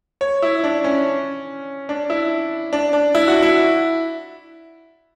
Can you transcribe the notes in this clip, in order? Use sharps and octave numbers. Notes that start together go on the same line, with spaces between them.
C#5
E4
D4
C#4
D4
E4
D4
D4
E4
F#4
E4